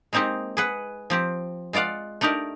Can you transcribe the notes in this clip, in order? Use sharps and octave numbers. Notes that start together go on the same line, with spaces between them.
G#3 A#3 C4 D#4 G4
G#4 B4 F#5
F3 C4 G4
G#3 F4 D5 F5 F#5
A3 D4 D#4 G4 A#4